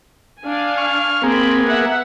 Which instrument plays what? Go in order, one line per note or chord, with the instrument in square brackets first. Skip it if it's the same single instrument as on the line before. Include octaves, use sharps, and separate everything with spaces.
[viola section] D4 F5 G#5
[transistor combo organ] C#6 F6
[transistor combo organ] A#3 G#4 [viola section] C4 B5
[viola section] B3 E5 F#5